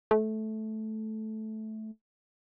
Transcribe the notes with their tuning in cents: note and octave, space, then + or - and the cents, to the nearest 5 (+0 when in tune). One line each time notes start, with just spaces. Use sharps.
A3 -10